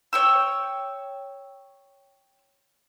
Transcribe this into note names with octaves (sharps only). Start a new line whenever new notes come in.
C#5 G5 E6